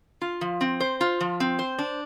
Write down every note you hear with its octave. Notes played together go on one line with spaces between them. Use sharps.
F4
F3
C4
C5
F4
F3
C4
C5
D4